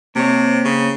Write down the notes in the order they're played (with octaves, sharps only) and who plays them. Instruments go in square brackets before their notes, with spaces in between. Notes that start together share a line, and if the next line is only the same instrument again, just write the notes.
[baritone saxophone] C3 [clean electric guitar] A#3 C5 C#5
[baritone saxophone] C#3